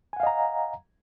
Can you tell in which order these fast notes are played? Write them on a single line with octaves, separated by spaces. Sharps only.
G#5 F#5 F5 D#5 A#5